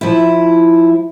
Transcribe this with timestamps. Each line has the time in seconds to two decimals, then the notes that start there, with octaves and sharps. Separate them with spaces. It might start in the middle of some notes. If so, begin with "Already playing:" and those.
0.01 F3 E4